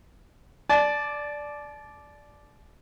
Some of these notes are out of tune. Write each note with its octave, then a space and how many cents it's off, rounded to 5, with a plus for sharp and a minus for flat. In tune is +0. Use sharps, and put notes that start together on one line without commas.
D5 +0 A5 -35